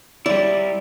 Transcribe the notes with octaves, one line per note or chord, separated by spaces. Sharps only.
G3 E4 D5